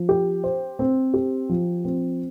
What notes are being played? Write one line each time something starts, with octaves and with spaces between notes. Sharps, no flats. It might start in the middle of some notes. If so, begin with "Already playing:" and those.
Already playing: F3
G4
C5
C4
G4
F3
C4